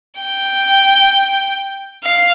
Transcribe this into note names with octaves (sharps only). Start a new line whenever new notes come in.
G5
F5